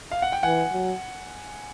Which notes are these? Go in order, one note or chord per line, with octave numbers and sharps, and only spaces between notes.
F5
F#5
G5
E3 F#5 G#5
F#3